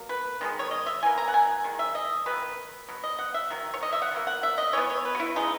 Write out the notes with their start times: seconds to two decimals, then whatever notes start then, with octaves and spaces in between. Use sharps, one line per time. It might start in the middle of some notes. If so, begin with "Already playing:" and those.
Already playing: B2 F#3 A#3
0.09 B4
0.41 D#3 G#3 B3
0.59 C#5
0.71 D#5
0.86 E5
1.03 E3 A#3 G#5
1.18 A#5
1.28 F#5
1.34 G#5
1.64 D#3 G#3
1.79 E5
1.95 D#5
2.26 D#3 F#3 B3 B4
2.89 B2 F#3
3.04 D#5
3.19 F#5
3.34 E5
3.50 D#3 F#3
3.74 C#5
3.83 D#5
3.92 E5
4.02 F#5
4.11 B2 F#3 A#3
4.27 F#5
4.43 E5
4.58 D#5
4.73 E3 B3 C#5
4.90 C#5
5.05 B4
5.15 F#4
5.20 E4
5.36 C#3 G#3 B3 D#4